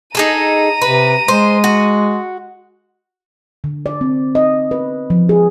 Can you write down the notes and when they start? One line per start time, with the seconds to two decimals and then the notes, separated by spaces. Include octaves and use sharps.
0.15 D#4 G#4 A4 A#5 D#7
0.82 C3 B4
1.28 G#3 C5
1.64 F#4
3.64 D3
3.86 D5
4.01 C4
4.35 D#5
4.71 B4
5.10 F3
5.29 G#4